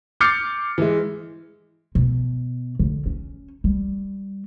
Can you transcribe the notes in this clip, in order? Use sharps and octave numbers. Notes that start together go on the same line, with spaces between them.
D6 F6 G6 A6 C7 C#7
E3 G#3
B2
D3
C#4
G3